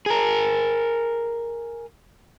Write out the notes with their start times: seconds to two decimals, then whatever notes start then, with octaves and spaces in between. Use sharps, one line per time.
0.06 G#4 A#4